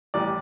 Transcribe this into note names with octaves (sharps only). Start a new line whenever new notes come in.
A1 A2 G3 D5